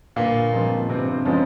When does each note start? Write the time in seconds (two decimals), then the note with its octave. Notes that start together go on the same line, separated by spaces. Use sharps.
0.16 G1 A#2 A#3
0.53 G2 F3 G#3 C4
0.89 G1 C3 C4
1.25 C#3 F3 G#3 C4 C#4